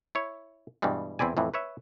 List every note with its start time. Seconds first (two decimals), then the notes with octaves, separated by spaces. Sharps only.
0.15 E4 C#5
0.82 G2 B2 E3 G3 G#3
1.19 E2 C4 E4 D5 G#5
1.37 F2 A2 E3
1.54 B4 C#5 E5